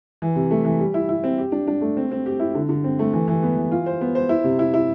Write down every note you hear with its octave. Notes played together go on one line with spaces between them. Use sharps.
E3
C3
A3
E3
G3
E4
E4
C4
G4
D4
D4
A3
C4
C4
G4
E4
D3
D3
C4
A3
E3
E3
B3
E3
F4
C5
B3
C5
E4
C3
E4
E4